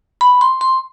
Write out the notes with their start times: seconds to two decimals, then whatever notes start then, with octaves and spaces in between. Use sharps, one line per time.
0.21 B5
0.41 C6
0.61 C6